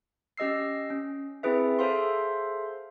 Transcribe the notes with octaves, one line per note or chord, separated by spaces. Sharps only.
C#4 G4 D#5 E6 C7
C#4
C4 E4 G#4 B4 E5
G#4 A4 C5 E5 F5 C6